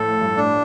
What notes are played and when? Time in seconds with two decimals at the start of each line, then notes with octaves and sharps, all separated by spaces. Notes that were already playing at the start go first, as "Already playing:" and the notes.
Already playing: A2 F3 A4
0.21 G2
0.37 D4